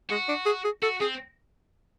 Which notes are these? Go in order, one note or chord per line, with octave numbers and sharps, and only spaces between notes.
G#3 F#4
D4
G#4
G#4
F#4 A4
C4 G#4